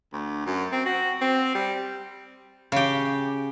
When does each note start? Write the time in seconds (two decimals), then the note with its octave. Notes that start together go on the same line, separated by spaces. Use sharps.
0.13 D2
0.46 F#2
0.72 C4
0.86 F#4
1.21 C4
1.55 G3
2.72 C#3 G4